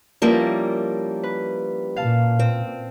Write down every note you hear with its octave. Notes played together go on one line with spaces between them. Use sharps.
F3 G3 A#3 C#4 E4 A#4
B4
A#2 F5 A5
C4